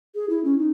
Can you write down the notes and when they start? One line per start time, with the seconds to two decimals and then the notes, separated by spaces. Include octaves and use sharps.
0.15 G#4
0.29 E4
0.44 C#4
0.59 D#4